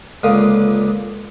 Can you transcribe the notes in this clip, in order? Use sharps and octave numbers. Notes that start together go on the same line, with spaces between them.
C#2 A#2 D3 F5 D#6